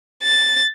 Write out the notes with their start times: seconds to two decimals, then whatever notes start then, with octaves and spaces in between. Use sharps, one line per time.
0.23 A6